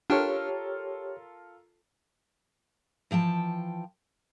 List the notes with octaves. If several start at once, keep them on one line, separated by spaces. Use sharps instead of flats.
D4 F4 G4 A4 A#4 C#5 G5 F6
E3 F3 G5 A5